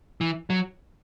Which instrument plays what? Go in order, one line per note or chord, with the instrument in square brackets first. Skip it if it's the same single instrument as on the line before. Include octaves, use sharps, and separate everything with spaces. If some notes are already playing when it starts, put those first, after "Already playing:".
[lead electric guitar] E3
F#3